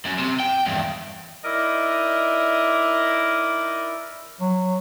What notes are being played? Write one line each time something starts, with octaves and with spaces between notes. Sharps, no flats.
F#2
C3
G5
E2 G2
D#4 E4 A#4 D5 D#5
F#3